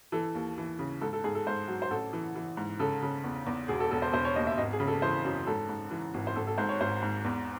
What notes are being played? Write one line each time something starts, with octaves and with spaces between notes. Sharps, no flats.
E3 A4
D#2
E3
C#3
G#2 A4
A4
G#2 G#4
A4
G#2 C5
F#3
C5
A1 A4
E3
E3
G#2
C#3 A4
C#3
E2
E2
E1 G#4
A4
E1 A4
C5
E1 C5
C#5
D#2 D#5
E5
G#1 D#5
G#4
C#3
A4
E3 C5
F#2
G#2 A4
G#2
E3
G#1
C5
G#1 A4
A4
G#2 C5
C#5
G#1 C5
G#2
E2